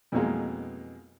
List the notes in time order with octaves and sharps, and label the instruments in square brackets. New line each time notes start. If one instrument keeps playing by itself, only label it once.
[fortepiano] F2 B2 E3 F#3 G#3 A#3